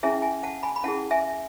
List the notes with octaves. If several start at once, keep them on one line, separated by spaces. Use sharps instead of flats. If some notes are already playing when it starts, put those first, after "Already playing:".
C#4 E4 G#4 E5 G#5
E5 G#5
F#5 A5
G#5 B5
B5
C#4 E4 G#4 F#5 A5
E5 G#5